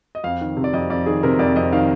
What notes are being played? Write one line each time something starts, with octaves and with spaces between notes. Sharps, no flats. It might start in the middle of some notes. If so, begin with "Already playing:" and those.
D#5
F2 F5
D#3
C3
D5
F2 D#5
F2 D5
D#3 G#4
C3 A#4
F2 D5
F2 D#5
D#3 F5